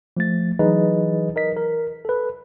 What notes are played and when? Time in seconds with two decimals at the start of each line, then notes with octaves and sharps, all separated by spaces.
0.17 F3 A3 A6
0.59 E3 F#3 D#4 G#4 B4 D#5
1.36 A#4 D#5 B6
1.56 A#4
2.05 A4 B4